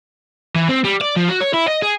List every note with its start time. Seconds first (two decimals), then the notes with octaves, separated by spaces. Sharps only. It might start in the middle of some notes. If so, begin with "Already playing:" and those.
0.56 E3
0.69 C4
0.84 G3
1.01 D5
1.17 F3
1.29 F#4
1.41 C#5
1.54 E4
1.68 D#5
1.82 G#4